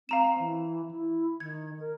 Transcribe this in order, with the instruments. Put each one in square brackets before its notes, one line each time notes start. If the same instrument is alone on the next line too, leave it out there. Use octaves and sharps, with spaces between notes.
[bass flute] C4 [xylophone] F5 A#5 E7
[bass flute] E3
E4
[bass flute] D#3 [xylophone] G#6
[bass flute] A#4